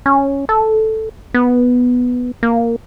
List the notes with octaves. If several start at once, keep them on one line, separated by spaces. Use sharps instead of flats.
C#4
A4
B3
A#3